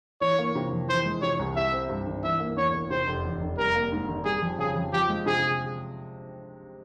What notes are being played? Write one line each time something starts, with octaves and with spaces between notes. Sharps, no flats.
E3 C#5
A#3
C3
F2
E3 C5
G#3
C3 C#5
C2
G3 E5
C4
G2
G#1
E3 E5
A#3
E2 C#5
E1
C3 C5
F1
E2
F1
G3 A#4
A#3
G#2
G#1
G3 G#4
F2
C#3 G#4
F2
F3 G4
G#3
C3 G#4